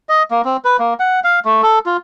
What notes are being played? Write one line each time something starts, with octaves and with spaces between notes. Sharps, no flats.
D#5
A#3
C4
B4
A#3
F#5
F5
A3
A4
F4